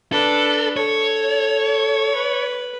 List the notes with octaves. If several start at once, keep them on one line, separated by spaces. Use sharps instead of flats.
D4 A4 B4
A4 C#5
B4